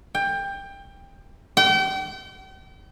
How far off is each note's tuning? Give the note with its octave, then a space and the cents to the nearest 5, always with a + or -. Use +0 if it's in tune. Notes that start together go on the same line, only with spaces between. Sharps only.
G5 +20
G5 -35